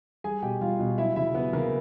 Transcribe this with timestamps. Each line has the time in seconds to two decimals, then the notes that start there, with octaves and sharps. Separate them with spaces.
0.24 G3 G#4 G#5
0.42 B2 G4 G5
0.61 G3 F4 F5
0.80 B2
0.98 F#3 E4 E5
1.16 C#3 E4 E5
1.34 F#3 B3 B4
1.53 C#3 A#3 A#4